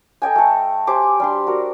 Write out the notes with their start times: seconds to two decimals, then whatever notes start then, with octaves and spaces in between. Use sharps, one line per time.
0.22 A4 D#5 G5 G#5
0.36 A3 A4
0.87 G4 C5 G#5 D6
1.20 G3 D4 C6
1.47 F#4 A#4